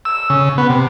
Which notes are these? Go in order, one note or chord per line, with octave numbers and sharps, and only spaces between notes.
E6
C#3
B3
C3